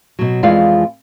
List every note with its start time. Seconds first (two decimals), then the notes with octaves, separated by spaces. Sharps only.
0.19 B2 F#3
0.43 F2 E3 G#3 F4 D5 F5